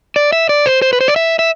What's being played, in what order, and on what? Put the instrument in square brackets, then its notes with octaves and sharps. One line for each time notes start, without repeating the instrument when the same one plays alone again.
[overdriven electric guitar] D5
E5
D5
C5
C5
B4
C5
D5
E5
E5